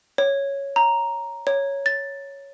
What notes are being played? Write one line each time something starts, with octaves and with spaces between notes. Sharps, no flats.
C#5
A#5
C#5
A6